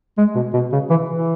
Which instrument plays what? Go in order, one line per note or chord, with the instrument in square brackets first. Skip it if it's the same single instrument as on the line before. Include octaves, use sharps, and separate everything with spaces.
[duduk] G#3
B2
B2
C#3
E3
E3